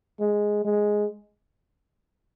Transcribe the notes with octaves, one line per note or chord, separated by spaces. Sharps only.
G#3
G#3